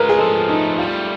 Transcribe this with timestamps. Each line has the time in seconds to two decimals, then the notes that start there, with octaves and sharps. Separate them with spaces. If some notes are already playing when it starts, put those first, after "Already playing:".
Already playing: G#3 F4 A#4 B4
0.09 G#4
0.19 F3 A4
0.49 A3 D#4
0.78 G3 F4